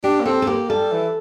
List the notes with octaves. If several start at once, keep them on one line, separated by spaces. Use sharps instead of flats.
D4 G4
A#3
C4 A4
A4
A#3 G4
G3 A4
E3